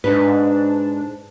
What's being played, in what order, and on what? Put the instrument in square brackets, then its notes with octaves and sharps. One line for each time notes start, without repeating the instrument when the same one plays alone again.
[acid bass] G#2 [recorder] D4 [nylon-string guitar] B4